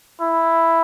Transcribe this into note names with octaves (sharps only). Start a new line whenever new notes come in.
E4